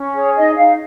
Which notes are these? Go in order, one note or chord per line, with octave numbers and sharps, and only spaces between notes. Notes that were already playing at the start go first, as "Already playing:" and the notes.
Already playing: C#4
G#4 C#5
D#4 D#5
D#4 F5